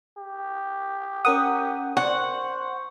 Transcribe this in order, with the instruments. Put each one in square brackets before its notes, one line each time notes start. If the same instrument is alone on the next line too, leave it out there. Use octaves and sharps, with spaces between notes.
[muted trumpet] G4
[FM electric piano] C#4 A#4 F#5 [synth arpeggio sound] D#6
[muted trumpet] C5 [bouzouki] F#5 [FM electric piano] C#6